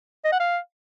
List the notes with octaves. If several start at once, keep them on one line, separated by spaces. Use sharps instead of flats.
D#5
F#5
F5